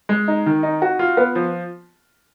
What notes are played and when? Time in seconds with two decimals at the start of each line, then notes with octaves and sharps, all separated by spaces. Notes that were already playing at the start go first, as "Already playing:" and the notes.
0.09 G#3
0.28 D#4
0.46 D#3
0.63 D#4
0.82 F#4
0.99 F4
1.17 B3
1.35 F3